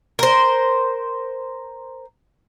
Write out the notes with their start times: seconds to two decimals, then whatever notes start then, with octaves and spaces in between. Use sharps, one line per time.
0.19 A#4 C5